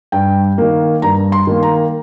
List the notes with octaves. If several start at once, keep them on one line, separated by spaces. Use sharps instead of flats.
G2 G5
D#3 A#3
G2 A#5
C6
D#3 A#3
A#5